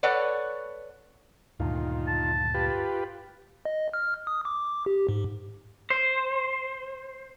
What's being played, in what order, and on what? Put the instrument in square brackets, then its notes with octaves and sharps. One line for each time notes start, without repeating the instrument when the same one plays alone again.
[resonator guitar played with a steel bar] A4 B4 C#5 D5 F#5
[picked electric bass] D2 G2 A#2 [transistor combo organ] D#3 F4
[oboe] A5
[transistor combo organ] F4 G4 B4
[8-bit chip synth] D#5
F6
D#6
D6
G4
G#2
[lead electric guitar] C5